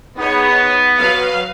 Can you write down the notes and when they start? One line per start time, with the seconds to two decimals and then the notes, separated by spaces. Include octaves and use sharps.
0.17 B3 D#4 G#4 C#5
0.98 F#3 B4 F5